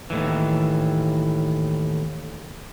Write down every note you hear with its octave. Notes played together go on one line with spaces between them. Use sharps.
D#2 A2 E3